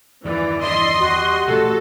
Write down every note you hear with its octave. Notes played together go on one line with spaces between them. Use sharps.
E2 G2 D#3 E3 D5
D3 E4 D#5 C6
E2 G3 F#4
A1 A#2 A3 A4